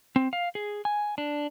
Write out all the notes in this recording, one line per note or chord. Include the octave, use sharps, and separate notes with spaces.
C4
F5
G#4
G#5
D4